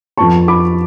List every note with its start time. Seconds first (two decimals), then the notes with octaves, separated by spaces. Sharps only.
0.17 F2 F3 B3 A5 C#6
0.48 B5 D6